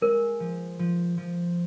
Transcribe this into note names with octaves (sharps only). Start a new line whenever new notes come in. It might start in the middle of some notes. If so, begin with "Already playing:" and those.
G#3 A#4
F3
F3
F3